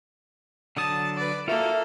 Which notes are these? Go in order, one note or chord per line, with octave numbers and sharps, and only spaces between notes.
D3 F#3 A5 D#6
B4 D5
A#3 F4 F#4 A4 A#4 E5